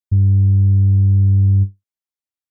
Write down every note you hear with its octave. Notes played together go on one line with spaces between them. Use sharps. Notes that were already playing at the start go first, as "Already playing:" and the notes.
G2